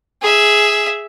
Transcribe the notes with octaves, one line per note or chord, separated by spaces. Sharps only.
G#4 E5